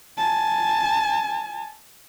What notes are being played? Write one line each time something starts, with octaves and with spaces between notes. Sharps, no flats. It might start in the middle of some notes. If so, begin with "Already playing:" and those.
G#5 A5